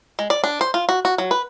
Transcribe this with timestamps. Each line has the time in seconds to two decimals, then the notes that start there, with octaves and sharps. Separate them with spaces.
0.19 G#3
0.30 D5
0.44 D4
0.61 C5
0.74 F4
0.89 F#4
1.05 F#4
1.18 F#3
1.31 B4